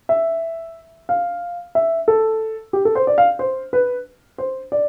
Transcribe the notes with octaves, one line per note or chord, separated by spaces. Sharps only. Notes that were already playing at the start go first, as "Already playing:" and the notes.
E5
F5
E5
A4
G4
A4
C5
D5
F5
C5
B4
C5
D5